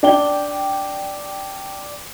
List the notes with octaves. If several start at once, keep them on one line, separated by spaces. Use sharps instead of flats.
D4 G5 G7